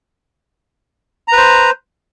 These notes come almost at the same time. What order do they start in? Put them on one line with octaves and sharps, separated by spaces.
A#5 B4 C5